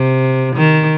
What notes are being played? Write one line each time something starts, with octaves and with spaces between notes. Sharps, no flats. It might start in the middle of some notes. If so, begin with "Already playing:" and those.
Already playing: C3
D#3